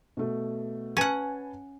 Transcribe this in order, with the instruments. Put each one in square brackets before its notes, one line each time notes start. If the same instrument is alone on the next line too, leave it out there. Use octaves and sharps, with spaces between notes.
[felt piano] B2 A3
[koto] C#4 F#5 [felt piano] B4 G#5 A5